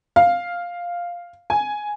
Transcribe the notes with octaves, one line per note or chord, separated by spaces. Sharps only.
F5
G#5